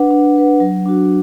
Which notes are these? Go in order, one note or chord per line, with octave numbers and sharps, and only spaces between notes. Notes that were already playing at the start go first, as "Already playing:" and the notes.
Already playing: D4 B4 F#5
D4
B4 F#5
F#3
D4 F#4